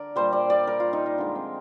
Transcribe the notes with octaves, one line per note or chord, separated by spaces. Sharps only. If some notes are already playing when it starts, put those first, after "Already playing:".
Already playing: D3 A#4 D5
A#2 G3 C5
D5
D5
A#4
F4
D#4
D#4
D3 F3 G#3 D4
C4